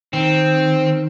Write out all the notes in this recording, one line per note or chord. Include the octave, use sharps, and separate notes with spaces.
D#3 C4